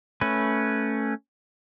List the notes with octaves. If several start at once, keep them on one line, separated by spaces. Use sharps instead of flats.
A3 C#4 B4